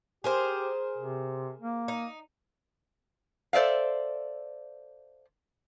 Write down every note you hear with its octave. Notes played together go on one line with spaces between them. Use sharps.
G4 G#4 A#4 C5
C3
A#3
D#4
A4 C5 D5 E5 F5